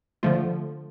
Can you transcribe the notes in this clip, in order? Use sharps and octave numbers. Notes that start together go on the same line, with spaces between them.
D3 F3 A3 F4